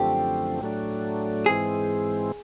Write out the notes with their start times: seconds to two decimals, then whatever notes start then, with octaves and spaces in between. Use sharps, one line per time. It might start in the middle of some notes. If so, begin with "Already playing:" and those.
Already playing: F#2 D3 F3 A3 C4 G4
0.61 A2 F#3 A3 D4
1.46 G#2 E3 G#3 C4 G#4